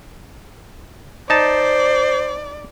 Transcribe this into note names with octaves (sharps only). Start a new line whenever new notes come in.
D#4 C5 D5 A5